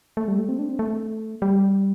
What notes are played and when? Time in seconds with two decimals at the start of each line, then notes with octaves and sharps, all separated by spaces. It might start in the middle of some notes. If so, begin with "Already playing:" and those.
0.17 A3
0.28 G3
0.38 A3
0.49 C4
0.59 D4
0.69 C4
0.79 A3
1.42 G3